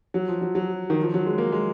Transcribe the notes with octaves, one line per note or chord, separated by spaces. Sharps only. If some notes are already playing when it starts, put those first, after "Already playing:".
F#3
F3
F#3
F#3
D#3
F3
F#3
G#3
A#3
G#3